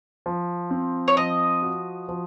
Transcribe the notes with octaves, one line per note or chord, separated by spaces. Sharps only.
F3
C4
C#5
F3 D#5
F#4
F3